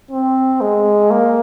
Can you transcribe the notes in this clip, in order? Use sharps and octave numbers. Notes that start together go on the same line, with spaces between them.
C4
G#3
A#3